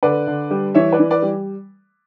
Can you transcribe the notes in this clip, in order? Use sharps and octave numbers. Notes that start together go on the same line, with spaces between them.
D3 B4 D5
D3
G3
E3 C#5 E5
B4 D5
E3
B4 D5
G3